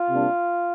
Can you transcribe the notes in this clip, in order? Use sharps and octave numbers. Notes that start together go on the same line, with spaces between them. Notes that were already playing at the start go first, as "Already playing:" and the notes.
Already playing: F4
C3 G3 A#3 D4